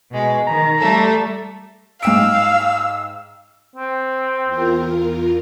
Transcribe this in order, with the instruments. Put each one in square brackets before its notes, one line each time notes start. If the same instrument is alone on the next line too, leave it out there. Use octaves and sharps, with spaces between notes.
[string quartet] B2 G#3
[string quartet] D#3 [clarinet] A#5
[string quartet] G3 A3 A4
[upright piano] G#2 G5 D7 [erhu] F5 [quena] E6
[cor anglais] C4
[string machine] E2 F4 A#4